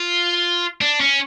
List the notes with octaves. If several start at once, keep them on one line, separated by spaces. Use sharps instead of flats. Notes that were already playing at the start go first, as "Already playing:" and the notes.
Already playing: F4
D4
C#4